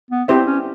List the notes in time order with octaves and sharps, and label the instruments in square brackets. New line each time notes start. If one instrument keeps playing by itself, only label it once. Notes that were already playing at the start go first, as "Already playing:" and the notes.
[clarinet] B3
[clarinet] C4 [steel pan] E4 G4 C5 E5
[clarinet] C#4